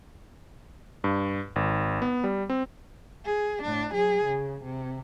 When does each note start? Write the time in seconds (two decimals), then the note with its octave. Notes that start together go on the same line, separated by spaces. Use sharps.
1.04 G2
1.56 G#1
2.02 B3
2.24 G3
2.50 C4
3.25 G#4
3.63 A2 D4
3.94 F#3 G#4
4.25 C#3
4.64 C3